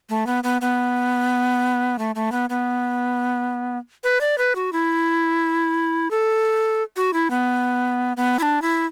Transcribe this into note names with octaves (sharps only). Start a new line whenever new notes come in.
A3
B3
B3
B3
A3
A3
B3
B3
B4
D5
B4
F#4
E4
A4
F#4
E4
B3
B3
E4
D4
E4